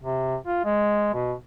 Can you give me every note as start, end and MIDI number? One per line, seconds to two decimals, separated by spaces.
0.02 0.36 48
0.47 0.60 65
0.64 1.10 56
1.14 1.33 47